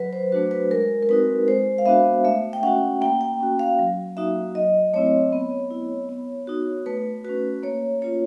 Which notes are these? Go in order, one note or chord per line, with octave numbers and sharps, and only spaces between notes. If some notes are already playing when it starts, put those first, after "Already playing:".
Already playing: F#3 B4
C5
A3 D4 F#4 B4
B4
G#3 A#4
A#4
C4 D#4 F#4 B4
G#3 C5
F5
B3 D4 F#4 E5
A3 E5
G5
C#4 F#4 F#5
A#3 G5
G5
C#4 F#4
F5
F#3
A#3 D#4 F#4 E5
F#3 D#5
A3 C4 E4 C#5
B3
E4
B3
D#4 F#4
A3 B4
C#4 F#4 B4
A#3 C#5
C#4 F4 C#5